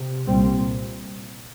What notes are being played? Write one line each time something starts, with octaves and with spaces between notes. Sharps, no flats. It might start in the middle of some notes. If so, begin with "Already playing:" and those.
Already playing: C3
C2 A#2 G3 C4